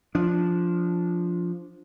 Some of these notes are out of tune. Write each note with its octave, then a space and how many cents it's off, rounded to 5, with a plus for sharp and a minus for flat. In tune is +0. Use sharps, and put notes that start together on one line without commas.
F3 +0 D4 -10